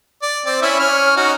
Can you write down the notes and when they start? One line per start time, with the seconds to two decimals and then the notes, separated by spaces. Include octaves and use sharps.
0.22 D5
0.46 C4 D5
0.62 C#4 E4 E5
0.79 C#4 F6
1.16 C#4 D#4 F#4